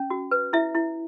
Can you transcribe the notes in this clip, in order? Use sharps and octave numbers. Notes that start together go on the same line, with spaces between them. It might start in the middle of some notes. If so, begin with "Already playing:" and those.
Already playing: C#4
F#4
B4
E4 E5
E4